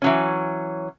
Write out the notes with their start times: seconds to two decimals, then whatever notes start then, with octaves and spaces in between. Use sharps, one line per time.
0.02 E3 F#3 C#4